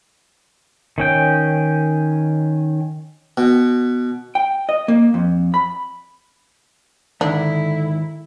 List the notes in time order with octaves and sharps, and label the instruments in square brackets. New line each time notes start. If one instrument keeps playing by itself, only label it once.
[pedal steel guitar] D#3 C#4 G5
[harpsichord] B2
[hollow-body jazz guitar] G5
D#5
A#3
F2
B5
[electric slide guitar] G#2 D#3 [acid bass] D3 [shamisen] D4 [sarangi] E4